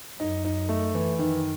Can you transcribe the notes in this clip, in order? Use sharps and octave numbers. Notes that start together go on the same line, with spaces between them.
F#2 D#4
D#4
A3
E3
F#2 D#3